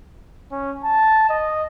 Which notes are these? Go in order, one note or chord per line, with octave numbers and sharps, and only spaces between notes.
C#4
A5
D#5